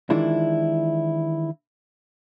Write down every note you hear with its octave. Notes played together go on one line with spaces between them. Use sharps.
D#3 E3 G#3 D4 E4 F4